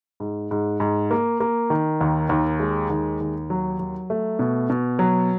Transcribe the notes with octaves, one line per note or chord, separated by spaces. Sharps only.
G#2
G#2
G#2
A#3
A#3
D#3
D#2
D#2
G#3
D#2
D#2
F#3
F#3
A3
B2
B2
F#3